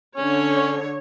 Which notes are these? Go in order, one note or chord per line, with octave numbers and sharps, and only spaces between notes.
D3 C#4 C#5